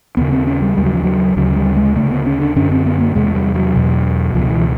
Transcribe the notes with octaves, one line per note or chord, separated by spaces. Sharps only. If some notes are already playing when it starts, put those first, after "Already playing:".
D#2 C#3 B3
C4
C#4
G3
D#2 C#3 G3
F#3
F3
F#3
D2 C#3 F#3
G3
G#3
D2 C#3 A3
B3
C#4
D4
F#2 D3 C#4
C4
B3
A#3
E2 C3 G#3
G3
F#3
E2 B2
C#2 B2 F3
E3